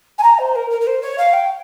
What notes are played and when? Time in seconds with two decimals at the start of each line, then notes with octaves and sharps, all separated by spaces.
0.18 G#5
0.23 A#5
0.38 C5
0.55 A#4
0.70 A#4
0.80 A#4
0.86 C5
1.01 C#5
1.18 F5
1.33 G5